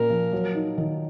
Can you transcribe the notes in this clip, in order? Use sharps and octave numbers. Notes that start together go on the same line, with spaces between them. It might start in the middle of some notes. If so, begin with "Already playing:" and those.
Already playing: A#2 A#3 C#4 A#4
F3
F#3
D#4
D#3